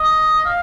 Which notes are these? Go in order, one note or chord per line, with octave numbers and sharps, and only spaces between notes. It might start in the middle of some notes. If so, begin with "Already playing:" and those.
Already playing: D#5
F5